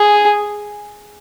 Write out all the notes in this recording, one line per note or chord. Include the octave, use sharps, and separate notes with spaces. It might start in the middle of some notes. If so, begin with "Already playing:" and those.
Already playing: G#4